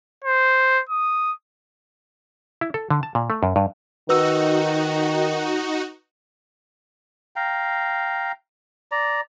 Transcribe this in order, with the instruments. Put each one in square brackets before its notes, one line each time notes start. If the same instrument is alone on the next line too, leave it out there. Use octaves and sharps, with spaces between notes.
[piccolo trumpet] C5
D#6
[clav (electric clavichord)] E4
A4
D3
A5
A#2
A3
F#2
G2
[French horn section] D#3 [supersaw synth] D#4 F#4 [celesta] B4 E6
[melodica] F5 G5 A#5
D5 A#5